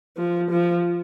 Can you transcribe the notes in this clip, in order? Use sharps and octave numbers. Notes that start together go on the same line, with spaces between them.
F3
F3